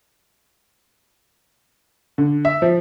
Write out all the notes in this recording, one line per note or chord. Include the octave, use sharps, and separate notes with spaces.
D3
E5
F3